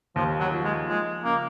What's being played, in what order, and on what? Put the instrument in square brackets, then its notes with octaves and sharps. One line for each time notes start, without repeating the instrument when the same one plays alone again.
[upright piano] D#2 [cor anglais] F3
[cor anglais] F#3
[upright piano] F3
[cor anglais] G#3
[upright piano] F3 [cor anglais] G#3
[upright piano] C#3 [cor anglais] A#3